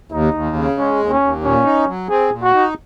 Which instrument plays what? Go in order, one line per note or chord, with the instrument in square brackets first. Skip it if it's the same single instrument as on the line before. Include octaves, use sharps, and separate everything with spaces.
[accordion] D#2 [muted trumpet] D#4
[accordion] D#2
C#3
[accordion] G#3 [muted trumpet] C#4
[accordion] D#2
[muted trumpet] C#4
[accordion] D#2
[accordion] A#2 [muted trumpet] C#4
[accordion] D#4
F#3
[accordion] C4 [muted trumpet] G#4
[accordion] A#2
[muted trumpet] F#4
[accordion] D#4